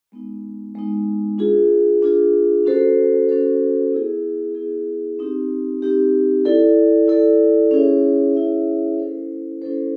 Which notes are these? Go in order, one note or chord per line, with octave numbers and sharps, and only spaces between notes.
G#3 B3 D#4
G#3 B3 D#4
D4 F4 G#4
D4 F4 G#4
C#4 F#4 A4 C5
C#4 F#4 A4 C5
B3 E4 G#4
B3 E4 G#4
C4 D#4 G4
C4 D#4 G4
E4 A4 D5
E4 A4 D5
C#4 E4 G#4 C#5 E5
C#4 E4 G#4 C#5 E5
C#4 E4 A4 C5
C#4 E4 A4 C5